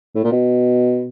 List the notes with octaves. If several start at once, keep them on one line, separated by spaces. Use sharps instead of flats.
A2
A#2
B2